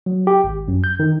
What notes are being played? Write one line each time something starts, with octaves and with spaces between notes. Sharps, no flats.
F#3
G4
G#1
F#2
G6
D#3